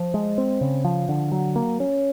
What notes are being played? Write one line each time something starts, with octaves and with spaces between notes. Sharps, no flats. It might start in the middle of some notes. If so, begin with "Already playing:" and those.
Already playing: F3
G#3
C4
C#3
F3
D3
F#3
A#3
C#4